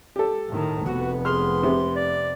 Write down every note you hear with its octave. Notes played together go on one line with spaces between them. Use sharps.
G4 A4
A2 D#3
F1 B3 F#4
G#4 C6 F6
C3
D5